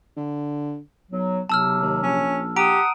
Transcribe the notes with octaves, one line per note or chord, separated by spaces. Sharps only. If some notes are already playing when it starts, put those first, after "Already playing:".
D3
B1 F#3
B1 C3 F#3 A5 E6 F6
D#2
A#1 C#4
G4 F#5 A#5 D#6 D7